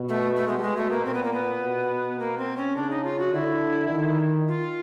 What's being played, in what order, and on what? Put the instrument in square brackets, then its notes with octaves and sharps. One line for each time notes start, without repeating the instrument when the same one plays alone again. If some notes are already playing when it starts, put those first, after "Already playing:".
Already playing: [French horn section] B2
[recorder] A3
A3
[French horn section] B2 [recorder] G#3
[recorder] G3
G#3
A3
A#3
[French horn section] A#2 [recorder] C4
[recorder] B3
A#3
B3
[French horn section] B2
[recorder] A#3
C4
C#4
[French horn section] C#3 [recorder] D4
[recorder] D#4
F4
F#4
[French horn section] D3 [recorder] E4
[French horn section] D#3
[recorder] F4